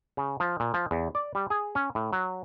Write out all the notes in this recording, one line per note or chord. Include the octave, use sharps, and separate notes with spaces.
C#3
F3
A#2
F3
E2
D5
G3
G#4
C#4
A2
F#3